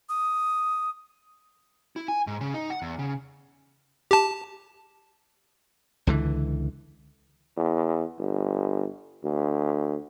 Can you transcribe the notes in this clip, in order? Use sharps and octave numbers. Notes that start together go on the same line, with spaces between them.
D#6
E4
G#5
G#2
C#3
D#4
F#5
E2
C#3
G4 A5
C#2 D3 E3
E2
G1
D2